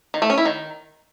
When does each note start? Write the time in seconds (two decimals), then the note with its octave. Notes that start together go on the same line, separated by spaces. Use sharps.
0.14 D#3
0.22 A3
0.30 C#4
0.38 E4
0.45 D#3